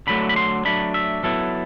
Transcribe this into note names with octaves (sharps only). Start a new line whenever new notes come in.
D3 F#3 A3 B5
B5
C6
F#3 A3 D4 B5
E5
F#3 B3 E4 A4